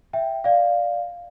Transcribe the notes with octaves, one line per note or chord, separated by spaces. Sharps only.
E5 G5
D5 F5